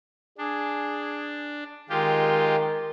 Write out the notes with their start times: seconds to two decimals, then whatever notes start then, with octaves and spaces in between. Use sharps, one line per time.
0.38 D4 G#4
1.90 D#3 G#3 F4 G4